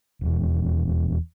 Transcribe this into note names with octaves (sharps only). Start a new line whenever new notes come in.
D#1 E2